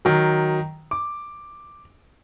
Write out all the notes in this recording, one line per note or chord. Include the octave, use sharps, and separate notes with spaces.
D#3 F#3
D6